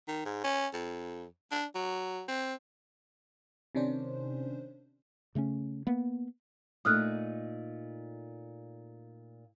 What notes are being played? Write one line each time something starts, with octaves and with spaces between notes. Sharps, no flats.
D#3
G#2
C#4
F2
D4
F#3
C4
C3 D#3 C#4 D4 C5
C#3 A3 A#3 C#4
A#3 B3
A#2 A3 D#4 D#6 F6 F#6